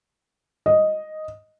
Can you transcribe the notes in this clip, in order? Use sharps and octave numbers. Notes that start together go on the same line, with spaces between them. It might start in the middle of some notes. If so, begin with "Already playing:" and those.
D#5